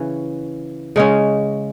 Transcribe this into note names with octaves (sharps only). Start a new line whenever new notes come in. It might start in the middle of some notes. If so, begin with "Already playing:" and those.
Already playing: C#3 E3 C#4
C#3 G#3 C#4